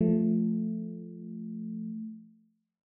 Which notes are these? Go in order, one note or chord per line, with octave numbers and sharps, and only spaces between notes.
F3 A3